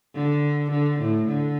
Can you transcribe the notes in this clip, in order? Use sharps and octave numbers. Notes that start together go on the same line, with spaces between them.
D3
D3
A2
D3